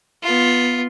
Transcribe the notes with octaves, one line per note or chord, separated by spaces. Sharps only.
B3 F4